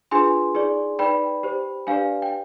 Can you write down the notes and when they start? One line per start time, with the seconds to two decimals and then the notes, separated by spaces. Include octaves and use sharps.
0.11 D4 F4 G#4 B4 G#5 C6
0.55 D#4 G#4 D5
0.99 D#4 B4 D5 G5 B5
1.43 G4 C5
1.87 D4 G4 B4 D5 F5 G#5
2.22 G5